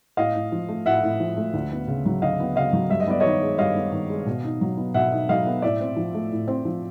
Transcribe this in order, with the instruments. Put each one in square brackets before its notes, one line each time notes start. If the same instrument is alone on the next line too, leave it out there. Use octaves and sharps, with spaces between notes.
[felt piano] A2 [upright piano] D#5 F5
[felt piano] A2
F3
A3
[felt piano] A2 [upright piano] E5 F#5
[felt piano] A2
F3
A3
D2
B3
C#3
F#3
[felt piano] D2 [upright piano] D#5 F5
[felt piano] B3
[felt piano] C#3 [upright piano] D#5 F5
[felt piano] F#3
[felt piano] G2 [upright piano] E5
[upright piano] D#5
[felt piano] B3 [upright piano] D5
[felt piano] D#3 [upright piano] C#5 D#5
[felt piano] G#3
[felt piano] G2 [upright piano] D#5 F5
[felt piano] B3
D#3
G#3
B2
D#4
F#3
B3
[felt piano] B2 [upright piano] E5 F#5
[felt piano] D#4
[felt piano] F#3 [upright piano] D#5 F5
[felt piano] B3
[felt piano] A2 [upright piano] D5 E5
[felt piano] C4
F3
A3
A2
C4
F3